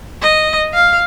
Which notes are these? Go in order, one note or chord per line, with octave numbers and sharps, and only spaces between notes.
D#5
F5